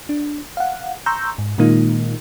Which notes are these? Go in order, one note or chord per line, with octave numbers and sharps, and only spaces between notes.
D4
F5 F#5
A#5 C6 C#6 E6 G6
G#2
A#2 D#3 G#3 A#3 D#4 F4